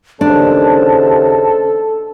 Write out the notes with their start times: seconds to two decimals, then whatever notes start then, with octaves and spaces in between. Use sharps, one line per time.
0.21 D#2 C#3 D4 A4 C5 A5